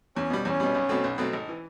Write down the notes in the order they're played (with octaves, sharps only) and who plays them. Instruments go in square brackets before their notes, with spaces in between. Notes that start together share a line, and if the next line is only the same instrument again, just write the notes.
[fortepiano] E2 [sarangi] C#4
[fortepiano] B2 G3
[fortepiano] E2 [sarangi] C#4
[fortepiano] B2 G3
B1
B2 F#3 A3 C4
B1
B2 F#3 A3 C4
G#1
E3